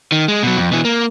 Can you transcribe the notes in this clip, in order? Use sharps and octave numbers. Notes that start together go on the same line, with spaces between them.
D#3
G#3
B2 F#3
F2
B2 E3
A#3